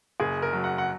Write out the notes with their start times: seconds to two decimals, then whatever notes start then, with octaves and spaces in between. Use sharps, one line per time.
0.20 F#1 G#4
0.42 A#4
0.53 F#3
0.64 F#5
0.78 F#5